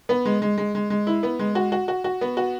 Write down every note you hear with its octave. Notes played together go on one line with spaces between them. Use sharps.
B3
G#3
G#3
G#3
G#3
G#3
E4
B3
G#3
F#4
F#4
F#4
F#4
B3
F#4